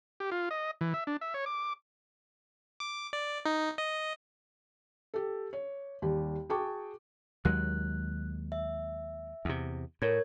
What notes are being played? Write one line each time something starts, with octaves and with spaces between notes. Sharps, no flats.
G4
F4
D#5
E3
E5
D4
E5
C#5
D6
D6
D5
D#4
D#5
G4 A4
C#5
D#2 G3 G4
F#4 G#4 G5 A5 C#6 D6
D#2 F#3 G#3 F#6
E5
E2 C3
A2 A#4 C#5 G#6